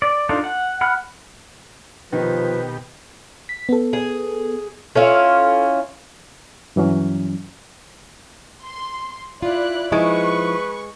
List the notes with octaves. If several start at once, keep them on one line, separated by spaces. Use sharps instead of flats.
D5
D4 D#4 F4 A4
F#5
F#5 B5 F6 F#6
B2 D#3 F3 G4 B4
B6
B3 A4
G#4
C#4 E4 F4 A4
G2 E3 F#3 C#4
C6
E4 F4 D5 F#6
F3 G#3 D#4 E4 B4 C#6